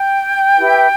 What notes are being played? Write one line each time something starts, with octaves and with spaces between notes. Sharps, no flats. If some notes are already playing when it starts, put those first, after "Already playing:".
Already playing: G5
E4 G4 B4